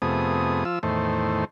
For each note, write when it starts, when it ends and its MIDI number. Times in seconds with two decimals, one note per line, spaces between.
0.02 0.64 41
0.02 0.64 48
0.02 0.64 57
0.02 0.64 59
0.02 0.64 68
0.02 0.64 87
0.65 0.79 53
0.65 0.79 65
0.65 0.79 88
0.83 1.45 40
0.83 1.45 45
0.83 1.45 51
0.83 1.45 57
0.83 1.45 72